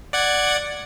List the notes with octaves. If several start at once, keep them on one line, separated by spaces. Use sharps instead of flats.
D5 F#5 G#6